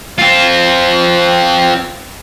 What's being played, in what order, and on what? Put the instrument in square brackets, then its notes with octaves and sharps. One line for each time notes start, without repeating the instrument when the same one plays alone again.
[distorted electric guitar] C4 F4